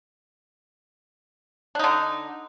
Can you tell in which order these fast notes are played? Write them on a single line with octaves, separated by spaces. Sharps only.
D4 D#4 D3